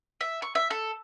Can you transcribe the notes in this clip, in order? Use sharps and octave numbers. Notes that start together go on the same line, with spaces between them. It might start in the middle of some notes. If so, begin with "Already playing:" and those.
E5
C#6
E5
A4